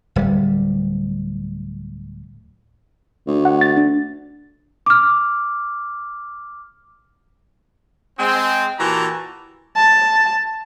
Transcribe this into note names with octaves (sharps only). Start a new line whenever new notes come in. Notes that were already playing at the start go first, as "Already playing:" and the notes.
D1 G3
D2
F#5
A6
D4
D6 F6
G#3 C4
A#2 E3 F#4 G4 A5 A#5
A5